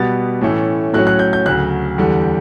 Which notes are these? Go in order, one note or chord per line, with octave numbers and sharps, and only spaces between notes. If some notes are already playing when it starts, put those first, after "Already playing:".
Already playing: B2 G3 B3 A6
A2 E3 A3 C#4
A2 F#3 C#4 F#6
F#6
G6
G6
D2 C#3 F#3 F#6
E2 D3 G3